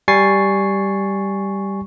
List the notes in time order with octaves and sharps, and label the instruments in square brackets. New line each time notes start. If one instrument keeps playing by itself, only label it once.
[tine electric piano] G3 G#5 C#6 A6 C7